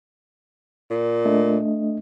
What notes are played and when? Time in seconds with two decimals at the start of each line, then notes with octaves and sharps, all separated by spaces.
0.91 A#2
1.25 A3 D4 D#5